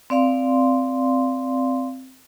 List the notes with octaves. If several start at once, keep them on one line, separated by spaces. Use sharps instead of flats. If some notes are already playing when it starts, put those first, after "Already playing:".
C4 D5 F5 C6